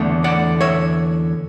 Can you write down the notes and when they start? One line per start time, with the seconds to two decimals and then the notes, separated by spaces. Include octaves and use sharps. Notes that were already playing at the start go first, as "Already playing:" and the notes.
Already playing: E2 D3 A3
0.24 D5 F#5
0.61 C#5 E5